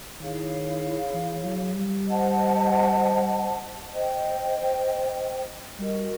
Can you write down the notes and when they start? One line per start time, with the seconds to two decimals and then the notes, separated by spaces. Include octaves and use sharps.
0.20 D#3 E4 G#4 C#5 F5
1.14 E3
1.45 F#3
1.76 G3
2.07 C5 D#5 F#5 A5
3.93 C5 D#5 G5
5.78 G3 F#4 A#4 D#5